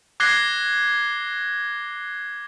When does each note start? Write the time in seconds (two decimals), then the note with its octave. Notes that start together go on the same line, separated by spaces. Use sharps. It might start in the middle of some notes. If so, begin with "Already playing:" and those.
0.20 D6 F#6 G#6 A#6 C7 G7